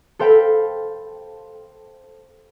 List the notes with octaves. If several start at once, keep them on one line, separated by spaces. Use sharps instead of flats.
A4 C5 F5 G5 B5